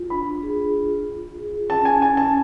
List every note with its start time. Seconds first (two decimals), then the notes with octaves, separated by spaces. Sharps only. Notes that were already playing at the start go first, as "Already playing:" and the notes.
Already playing: F4
0.10 D4 B5
0.43 G#4
0.74 F4
1.06 F4
1.38 G#4
1.69 C#4 A5
1.85 G#5
2.01 C#4 G#5
2.17 A5